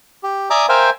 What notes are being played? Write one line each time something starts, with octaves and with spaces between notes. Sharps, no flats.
G4
D5 E5 G#5 A#5 D6 D#6
A#4 C5 E5 F5 G5 G#5